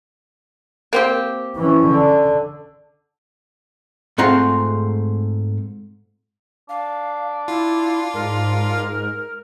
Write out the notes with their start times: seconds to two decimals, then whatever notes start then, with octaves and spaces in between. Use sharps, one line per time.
0.93 A#3 C4 G4
1.56 E3 C#4
1.88 D3
4.18 G#2 A3 C4 F4 F#5 A#5
6.69 D4 F5
7.48 E4 F4
8.14 G#2 A#4